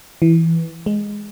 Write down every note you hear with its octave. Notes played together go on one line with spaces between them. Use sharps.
E3
G#3